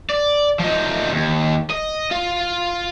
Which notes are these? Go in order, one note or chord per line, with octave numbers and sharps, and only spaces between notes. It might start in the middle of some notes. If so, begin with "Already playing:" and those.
D5
F3 D#4
D#2
D#5
F4